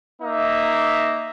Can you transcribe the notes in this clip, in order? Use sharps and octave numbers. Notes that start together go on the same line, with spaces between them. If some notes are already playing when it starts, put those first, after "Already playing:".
A#3 D#4 E5